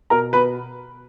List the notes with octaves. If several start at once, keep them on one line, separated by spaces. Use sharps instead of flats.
B2 A#4 A#5
B2 B4 B5